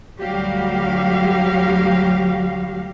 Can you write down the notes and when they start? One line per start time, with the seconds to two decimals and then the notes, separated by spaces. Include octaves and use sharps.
0.19 D2 F#3 G3 F#4 G4 F5